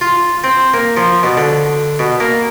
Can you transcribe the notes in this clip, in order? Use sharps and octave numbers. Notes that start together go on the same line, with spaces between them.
F4
C4
A#3
F3
B2
D3
B2
A#3